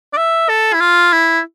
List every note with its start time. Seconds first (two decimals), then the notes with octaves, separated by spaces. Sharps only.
0.13 D5
0.17 E5
0.49 A4
0.74 E4
0.80 F4
1.13 E4